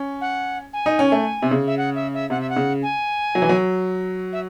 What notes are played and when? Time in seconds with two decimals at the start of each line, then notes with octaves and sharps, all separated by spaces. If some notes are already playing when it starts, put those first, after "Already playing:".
Already playing: C#4
0.21 F#5
0.73 G#5
0.86 D#4
0.99 C#4
1.12 A3
1.42 C3
1.51 C#3
1.67 E5
1.77 F#5
1.95 E5
2.13 E5
2.30 C3 F#5
2.40 E5
2.49 F#5
2.56 C#3
2.82 G#5
3.35 F#3
3.42 E3
3.49 F#3
4.32 E5